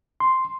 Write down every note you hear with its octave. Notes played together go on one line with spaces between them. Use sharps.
C6